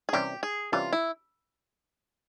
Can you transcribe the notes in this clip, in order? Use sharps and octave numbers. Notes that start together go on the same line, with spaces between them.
G#4
C3 E3 G3 C#4 G4
G#4
C3 E3 G3 C#4 F4
E4